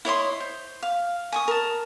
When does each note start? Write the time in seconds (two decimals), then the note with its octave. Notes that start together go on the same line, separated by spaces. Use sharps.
0.05 E4 C#5 D#5 C6
0.40 C5
0.83 F5
1.32 G#5 C#6 D#6
1.48 A#4 A5